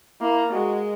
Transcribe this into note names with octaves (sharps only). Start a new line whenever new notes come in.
A#3 E4
G#3 F#4